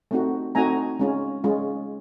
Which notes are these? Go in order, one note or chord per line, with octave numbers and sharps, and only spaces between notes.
A3 C4 D#4 F#4
A3 C4 D#4 F#4 G#5 A#5
G#3 C#4 F4
G#3 C#4 F4